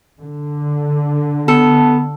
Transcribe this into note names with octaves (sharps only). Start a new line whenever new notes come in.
D3
B3 A4